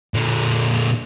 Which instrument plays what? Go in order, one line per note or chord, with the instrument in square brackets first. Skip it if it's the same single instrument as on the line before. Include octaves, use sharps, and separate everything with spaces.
[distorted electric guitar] A#2 D3